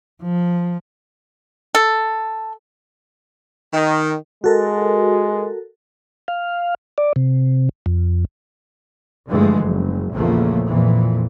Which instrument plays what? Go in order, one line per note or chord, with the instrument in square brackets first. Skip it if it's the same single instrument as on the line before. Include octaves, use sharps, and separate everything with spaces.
[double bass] F3
[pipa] A4
[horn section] D#3
[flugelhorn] G#3 [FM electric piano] F#4 A4 A#4
[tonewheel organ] F5
D5
C3
F2
[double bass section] G2 D3 E3 F3 G#3 A3
F#1
A#1 E2 C#3 F3 A3 A#3
F2 A#2 E3